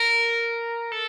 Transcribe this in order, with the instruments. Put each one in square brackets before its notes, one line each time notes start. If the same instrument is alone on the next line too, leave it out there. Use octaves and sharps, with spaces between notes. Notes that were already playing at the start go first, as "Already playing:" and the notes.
Already playing: [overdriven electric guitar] A#4
A4